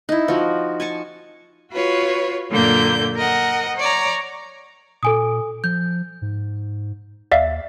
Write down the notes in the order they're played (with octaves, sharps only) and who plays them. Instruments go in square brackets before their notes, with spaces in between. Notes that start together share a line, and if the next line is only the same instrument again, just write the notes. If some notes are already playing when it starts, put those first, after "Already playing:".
[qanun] D#4 E4
F3 F#4
G#5 A5 C#6
[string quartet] F4 F#4 B4 C#5
F#2 A#2 D3 A#3 G6
A#4 D#5 F#5
C#5 D5 A#5
[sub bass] A#2 [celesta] A4 G#5 D#6
[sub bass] F3 [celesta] G6
[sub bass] G#2
[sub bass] D#2 [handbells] D5 E5 F5